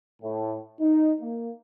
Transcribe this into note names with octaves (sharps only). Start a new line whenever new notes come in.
A2
D#4
A#3